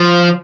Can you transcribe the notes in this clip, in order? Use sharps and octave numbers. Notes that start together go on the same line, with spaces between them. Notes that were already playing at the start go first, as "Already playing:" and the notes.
Already playing: F3